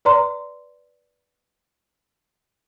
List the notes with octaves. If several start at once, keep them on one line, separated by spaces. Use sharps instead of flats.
B4 D5 A#5 C6